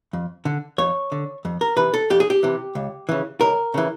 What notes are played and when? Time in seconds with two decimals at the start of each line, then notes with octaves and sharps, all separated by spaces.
0.13 F2
0.45 D3
0.78 F2 C#5
1.12 D3
1.45 F2
1.61 A#4
1.76 C3 E3 B4
1.94 A4
2.10 F2 G4
2.20 G#4
2.30 G4
2.43 C3 E3
2.75 C#2
3.09 C#3 E3
3.41 C#2 A#4
3.74 C#3 E3